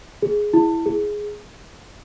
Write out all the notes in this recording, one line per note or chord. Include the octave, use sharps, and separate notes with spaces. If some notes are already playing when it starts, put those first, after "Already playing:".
G#4
E4
G#4